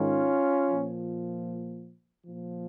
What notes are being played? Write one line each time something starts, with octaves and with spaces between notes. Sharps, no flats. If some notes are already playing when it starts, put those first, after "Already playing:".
Already playing: G#2 D#3 C#4 F4
A#2 F3
A#2 F3